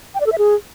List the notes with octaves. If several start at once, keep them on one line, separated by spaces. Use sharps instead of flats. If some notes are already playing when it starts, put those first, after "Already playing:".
G5
D5
A4
E5
G#4